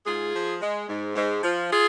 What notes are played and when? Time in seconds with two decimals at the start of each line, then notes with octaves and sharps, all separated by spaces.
0.06 G#2 F4 G#4
0.34 F3
0.61 G#3
0.89 G#2
1.16 G#2
1.43 F3
1.71 F4 G#4